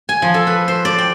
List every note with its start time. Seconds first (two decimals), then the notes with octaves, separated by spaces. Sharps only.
0.09 G#5
0.22 F3
0.34 A4
0.47 B4
0.68 C5
0.85 D5
0.98 G5